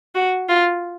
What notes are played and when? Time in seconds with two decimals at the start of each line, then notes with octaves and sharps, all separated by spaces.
0.15 F#4
0.49 F4